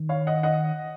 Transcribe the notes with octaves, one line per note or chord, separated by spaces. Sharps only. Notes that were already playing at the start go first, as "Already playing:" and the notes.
Already playing: D#3
C#5 F5
D#5 F#5
D#5 F#5